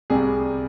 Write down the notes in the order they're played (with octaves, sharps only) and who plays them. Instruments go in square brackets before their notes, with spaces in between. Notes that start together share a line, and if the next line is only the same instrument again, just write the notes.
[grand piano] C2 C3 G3 G#4